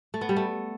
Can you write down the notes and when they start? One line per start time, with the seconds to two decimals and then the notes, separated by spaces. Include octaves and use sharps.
0.14 A3
0.21 B3
0.29 G3
0.37 A3